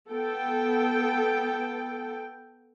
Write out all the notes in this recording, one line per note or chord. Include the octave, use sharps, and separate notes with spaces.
B3 A4 G5